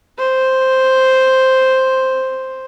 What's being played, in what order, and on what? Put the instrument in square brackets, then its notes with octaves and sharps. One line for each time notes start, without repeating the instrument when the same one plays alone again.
[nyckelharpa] C5